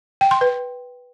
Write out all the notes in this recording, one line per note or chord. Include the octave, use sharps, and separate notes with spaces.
G5
C6
B4